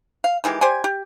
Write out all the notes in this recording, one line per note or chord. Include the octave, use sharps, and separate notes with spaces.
F5
D#3 E3 G#3 G4
G4 C5 D5 G#5
G4